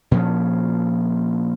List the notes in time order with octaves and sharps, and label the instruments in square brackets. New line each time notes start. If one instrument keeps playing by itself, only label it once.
[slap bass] A#2 F3 C#4